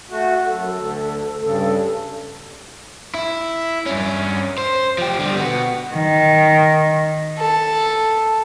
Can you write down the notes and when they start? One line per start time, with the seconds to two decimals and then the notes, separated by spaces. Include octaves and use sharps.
0.10 A3 F#4
0.46 F#2 A4
0.75 D2
1.41 G2 C#3 A4
3.14 E4
3.86 G2 C#4
4.58 C5
4.98 F3 G4
5.19 D3 G3
5.36 B3 F#4
5.94 D#3
7.40 A4